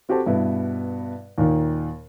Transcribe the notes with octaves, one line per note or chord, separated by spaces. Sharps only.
C4 F#4 G4 A4 C5 A5
G2 B2 E4 B4
D#2 A#2 D#3